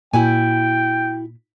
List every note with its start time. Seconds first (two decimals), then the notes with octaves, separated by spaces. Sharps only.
0.14 A#2 E4 F#4 G5 G#5